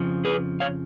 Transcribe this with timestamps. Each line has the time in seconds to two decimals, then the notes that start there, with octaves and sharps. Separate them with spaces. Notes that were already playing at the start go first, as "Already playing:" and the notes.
Already playing: F2 C#3 F3
0.25 G#4 B4
0.60 C#5 F5